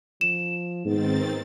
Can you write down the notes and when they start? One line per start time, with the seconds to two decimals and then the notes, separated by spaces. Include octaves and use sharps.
0.21 F3 E7
0.86 G#2 D#3 B3 C4 A6